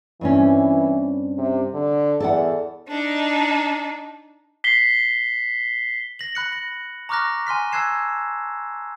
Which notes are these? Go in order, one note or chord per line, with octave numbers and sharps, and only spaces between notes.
G2 E3 C4 C#4
C3
D3
E2 A4 D5 F#5
D4 D#4
B6 C7 G7
A#6 F#7
B5 F#6 C#7
A#6
A#5 C#6 D6 F6 F#6 A#6
G#5 C6 F6 B6
A5 E6 F#6 G#6 C7 E7